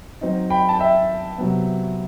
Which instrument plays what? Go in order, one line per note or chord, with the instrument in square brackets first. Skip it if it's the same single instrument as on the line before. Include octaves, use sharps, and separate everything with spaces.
[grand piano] F#3 C4 D#4
G5 B5
A5
E5 G5
C3 F#3 B3